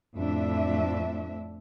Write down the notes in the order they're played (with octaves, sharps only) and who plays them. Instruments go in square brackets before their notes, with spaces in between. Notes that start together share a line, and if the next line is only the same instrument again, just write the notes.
[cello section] F2 A2 D4 E5